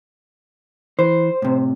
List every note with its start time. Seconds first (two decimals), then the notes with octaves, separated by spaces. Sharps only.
0.99 E3 C5
1.42 A2 C3